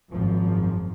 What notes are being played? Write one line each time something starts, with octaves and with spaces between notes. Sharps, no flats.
G#1 F#2 F3